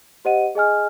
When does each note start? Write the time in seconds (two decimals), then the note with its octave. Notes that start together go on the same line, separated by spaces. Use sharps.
0.25 G4 C5 D#5 F#5 D#7
0.55 G#4 D#5 G#5 F6